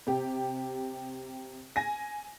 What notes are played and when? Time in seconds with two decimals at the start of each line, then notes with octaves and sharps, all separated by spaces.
0.07 C3 G4
1.76 G#5 A#6